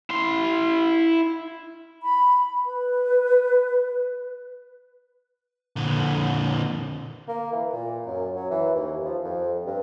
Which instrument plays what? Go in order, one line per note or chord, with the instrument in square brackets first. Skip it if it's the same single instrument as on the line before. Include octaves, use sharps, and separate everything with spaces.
[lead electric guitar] E4 C6
[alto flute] B5
B4
[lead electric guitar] A#2 D3
[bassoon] A#3
E3
A#2
F#2
F#3
E3
D#2
F3
F2
G2